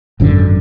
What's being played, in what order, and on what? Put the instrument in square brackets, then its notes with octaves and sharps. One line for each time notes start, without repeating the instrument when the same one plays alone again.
[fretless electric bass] G#1 F#2 D3